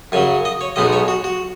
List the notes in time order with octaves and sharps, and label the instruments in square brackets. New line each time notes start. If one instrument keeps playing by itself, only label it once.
[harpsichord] F#2 C#3 F#3 G#5
D#5
C#5
B1 B2 G#3 B3 D#4 D#5
C#5
F#4
F#4